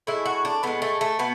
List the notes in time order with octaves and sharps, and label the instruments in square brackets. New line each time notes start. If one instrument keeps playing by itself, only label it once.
[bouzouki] A2 G#3 E4
F#4
D4
A2 G#3 B3
A3
A3
B2 B3